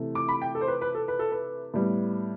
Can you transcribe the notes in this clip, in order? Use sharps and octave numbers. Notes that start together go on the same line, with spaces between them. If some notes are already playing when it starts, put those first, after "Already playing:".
Already playing: C3 E3 A3
D6
B5
G5
A4
C5
B4
B4
A4
B4
A4
B4
A2 G3 B3